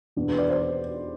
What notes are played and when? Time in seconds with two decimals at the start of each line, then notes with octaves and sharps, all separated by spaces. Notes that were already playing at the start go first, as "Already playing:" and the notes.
0.16 E2 B2 B3 D4
0.28 B4
0.39 D5
0.50 C5